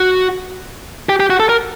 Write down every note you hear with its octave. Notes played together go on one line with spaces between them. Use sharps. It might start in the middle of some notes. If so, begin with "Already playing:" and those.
Already playing: F#4
G4
G4
F#4
A4
A#4